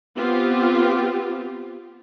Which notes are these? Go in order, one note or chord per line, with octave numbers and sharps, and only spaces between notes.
B3 C4 F4 G4